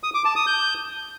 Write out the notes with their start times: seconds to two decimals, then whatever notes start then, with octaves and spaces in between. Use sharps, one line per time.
0.03 D#6
0.14 D6
0.25 A5
0.36 D#6
0.47 G6